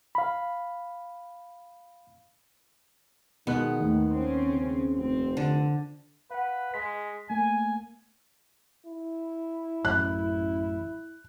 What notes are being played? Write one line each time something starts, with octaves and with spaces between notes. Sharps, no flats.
F5 B5
B2 D#3 G#3 B3 F#6
D#2 A2
C4 C#4
C#3
F1 C4
D3
B4 F5 F#5
G#3 B6
A3 A#3 G#5
E4
A1 F#2 F#6